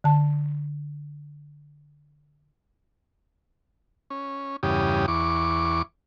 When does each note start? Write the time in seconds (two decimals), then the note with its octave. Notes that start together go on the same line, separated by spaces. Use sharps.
0.04 D3 A5
4.10 C#4
4.63 E2 G2 C#3 G4 D#6
5.08 E2 C#6 D6